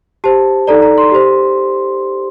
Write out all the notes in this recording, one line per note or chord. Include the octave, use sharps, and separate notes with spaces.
G4 C5 A5
D#4 A4 D5 A#5
A#5
C6
G4 C5